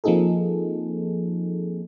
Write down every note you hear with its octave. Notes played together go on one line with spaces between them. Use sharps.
F3 A#3 C4 D#4 G#4 A4